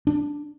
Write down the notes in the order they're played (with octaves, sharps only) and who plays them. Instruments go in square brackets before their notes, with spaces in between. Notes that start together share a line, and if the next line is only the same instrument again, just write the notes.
[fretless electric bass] D4